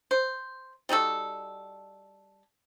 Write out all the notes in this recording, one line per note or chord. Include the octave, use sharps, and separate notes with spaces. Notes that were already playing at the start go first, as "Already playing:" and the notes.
C5
G3 D#4 F#4 A4